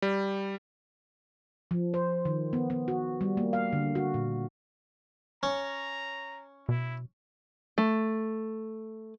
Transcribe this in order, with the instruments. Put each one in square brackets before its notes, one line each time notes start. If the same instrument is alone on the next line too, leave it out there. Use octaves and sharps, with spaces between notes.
[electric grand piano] G3
[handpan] F3
C5
D#3
B3
B3
F#4
G3
A#3
F5
D3
F#4
A#2
[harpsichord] C#4 [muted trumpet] A#5
[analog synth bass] B2 [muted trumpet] E4
[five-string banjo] A3